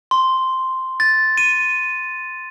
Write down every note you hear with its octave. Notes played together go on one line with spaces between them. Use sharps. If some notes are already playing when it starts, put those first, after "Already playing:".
C6
A6
D#7